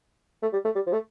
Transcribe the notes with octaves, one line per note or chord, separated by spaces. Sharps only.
A3
G3
A3
G3
F3
A3